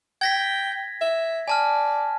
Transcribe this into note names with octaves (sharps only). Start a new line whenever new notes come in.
G5 G#6 A#6 B6
E5
D5 G#5 A5 F6